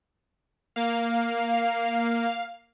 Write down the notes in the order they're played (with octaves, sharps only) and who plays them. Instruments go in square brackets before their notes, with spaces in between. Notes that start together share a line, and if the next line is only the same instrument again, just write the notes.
[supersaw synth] A#3 [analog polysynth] F5